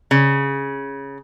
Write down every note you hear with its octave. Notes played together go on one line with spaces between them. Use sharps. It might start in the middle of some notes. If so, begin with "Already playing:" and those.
C#3